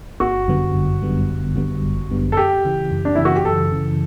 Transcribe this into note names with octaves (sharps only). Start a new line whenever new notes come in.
G1 F#4
F#2 D3 G3 B3
G1
F#2 D3 G3 B3
G1
F#2 D3 G3 B3
G1
F#2 D3 G3 B3
A4
F#2 G4
C#3 E3
F#2
D4
C#3 E3 E4
F#4
G4
F#2 A4
C#3 E3